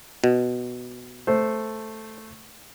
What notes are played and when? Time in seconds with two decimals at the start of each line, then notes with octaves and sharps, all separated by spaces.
0.24 B2
1.27 A3 C5